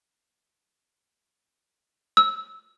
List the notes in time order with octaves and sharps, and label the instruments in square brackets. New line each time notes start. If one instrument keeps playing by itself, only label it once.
[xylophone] E6